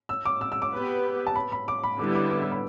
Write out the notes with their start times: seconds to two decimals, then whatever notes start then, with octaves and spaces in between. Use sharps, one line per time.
0.09 E6
0.25 D6
0.41 E6
0.52 E6
0.62 D6
0.73 B3 G4 B4
1.27 A5
1.36 B5
1.52 B5
1.68 D6
1.84 B5
1.99 D3 G3 B3 E4 D6
2.15 D6
2.31 D6
2.42 E6
2.52 B5